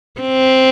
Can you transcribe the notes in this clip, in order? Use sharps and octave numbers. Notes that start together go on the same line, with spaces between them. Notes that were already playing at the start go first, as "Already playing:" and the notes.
C4